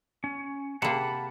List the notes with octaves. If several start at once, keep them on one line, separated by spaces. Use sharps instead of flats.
C#4
C3 A#3 F#5 A5 B5